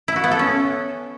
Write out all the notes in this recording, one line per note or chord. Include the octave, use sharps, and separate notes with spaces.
E4
F#4
B3
A4
C#4